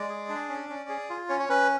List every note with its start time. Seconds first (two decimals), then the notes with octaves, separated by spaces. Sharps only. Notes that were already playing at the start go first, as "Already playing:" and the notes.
Already playing: G#3 D5
0.09 G#4
0.29 D4
0.49 C#4
0.70 C#4
0.89 G#4
1.10 F4
1.29 C#4 C#5
1.40 C#5
1.49 C#4 B4